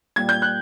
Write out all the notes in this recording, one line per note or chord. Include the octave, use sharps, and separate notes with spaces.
A#2 G3 G#6
G6
F#6